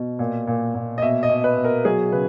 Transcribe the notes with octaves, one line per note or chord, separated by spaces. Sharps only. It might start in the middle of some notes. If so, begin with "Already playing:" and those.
Already playing: B2
A#2
A#2
A#2
D#5
B2 E5
D#5
B2
B4
B2
A#4
F#3 G#4
C#3 B4